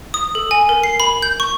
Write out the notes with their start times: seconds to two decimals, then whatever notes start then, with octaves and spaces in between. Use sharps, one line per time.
0.14 D#6
0.35 A4
0.51 G#5
0.69 A#4
0.84 C7
1.00 B5
1.22 G6
1.40 C#6